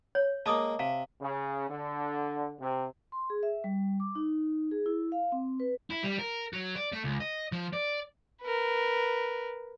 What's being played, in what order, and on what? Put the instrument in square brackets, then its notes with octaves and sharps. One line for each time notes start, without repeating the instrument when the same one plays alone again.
[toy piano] C#5
[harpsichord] G#3 A#3 [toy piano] A5 D6 D#6
[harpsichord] C3 [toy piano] F5
[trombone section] C#3
D3
C3
[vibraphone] C6
G#4
E5
G3
D6
D#4
G#4
E4
F5
C4
B4
[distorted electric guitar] E4
G3
A#4
F#3
D5
A3
C#2
D#5
F3
D5
[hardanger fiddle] A#4 B4